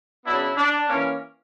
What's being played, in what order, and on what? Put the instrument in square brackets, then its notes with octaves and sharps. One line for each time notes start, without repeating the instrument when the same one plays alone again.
[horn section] C#3 F#3 B3 D4 E4
D4
E3 A#3 C#4